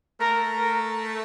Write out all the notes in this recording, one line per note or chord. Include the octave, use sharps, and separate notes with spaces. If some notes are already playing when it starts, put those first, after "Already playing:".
A3 A#4
A#4